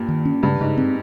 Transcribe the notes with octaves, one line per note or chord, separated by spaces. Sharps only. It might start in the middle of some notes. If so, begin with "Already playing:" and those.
Already playing: G2 A#2
D#3
C#4
G2 C#3
G#2 C#3
C4